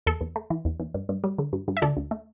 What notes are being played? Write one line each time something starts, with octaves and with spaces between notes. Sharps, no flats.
E2 A4
E2
A3
E3
E2
E2
G2
G2
G3
D3
G2
G2
E5
D2 A4 D5
D2
A3